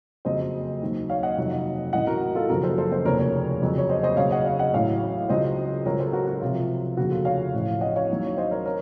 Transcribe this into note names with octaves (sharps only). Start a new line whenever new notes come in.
F#1 F2 C#3 F#3 C5 D#5
D#2 D#3 F#3
C#5 F5
D#5 F#5
F2 C3 D#3 F#3
A1 A2 F#3 D#5 F#5
F#4 A#4
F4 A4
F#1 F#2 C#3 F3 F#4 A#4
A4 C5
A4 C5
A4 C5
F1 D#2 C#3 F3 A#4 C#5
A#4 C#5
F2 C#3 F#3
C#5
C5 D#5
C5 D#5
D#2 C#3 F#3 C#5 F5
D#5 F#5
C#5 F5
D#5 F#5
A1 A2 F#3 C#5 F5
C#2 C#3 F#3 C5 D#5
C#2 C#3 F#3 A#4 C#5
A4 C5
F#4 A#4
F#4
C#2 C3 F3 F4
F1 D#2 C#3 F3 F#4
F4 A4
C#5 F5
A1 A2 F3
D#5 F#5
C#5 F5
D#2 D#3 F#3
C5 D#5
A#4 C#5
A#4 C#5